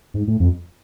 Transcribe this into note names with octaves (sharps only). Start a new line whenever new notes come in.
G#2
A2
F2